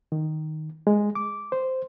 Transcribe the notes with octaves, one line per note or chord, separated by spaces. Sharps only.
D#3
G#3
D6
C5